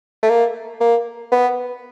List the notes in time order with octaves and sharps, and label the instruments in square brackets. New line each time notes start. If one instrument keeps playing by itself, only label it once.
[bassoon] A3
A#3
A#3
B3